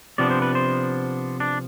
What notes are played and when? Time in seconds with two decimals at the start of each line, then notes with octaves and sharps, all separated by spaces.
0.18 C3 F3 B3 D4 D5
0.30 C5
0.42 B4
0.55 C5
1.40 D4